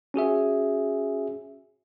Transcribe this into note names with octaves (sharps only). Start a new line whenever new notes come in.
C#4 F#4 G#4 E5